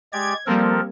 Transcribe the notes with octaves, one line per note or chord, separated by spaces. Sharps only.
G#3 G4 D5 G#6
F3 G3 A#3 C4 A4 A#4